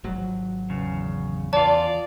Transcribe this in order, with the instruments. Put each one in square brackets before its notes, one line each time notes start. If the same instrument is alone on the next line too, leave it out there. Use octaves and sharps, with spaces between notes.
[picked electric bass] G#1 F3 F#3
[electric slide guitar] E2 C#3
[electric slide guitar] E2 F4 [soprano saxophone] D5 [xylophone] A5